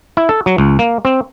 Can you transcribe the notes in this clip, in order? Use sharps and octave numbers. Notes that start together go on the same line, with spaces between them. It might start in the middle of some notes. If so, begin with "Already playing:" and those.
E4
A4
F#3
C#2
A#3
C4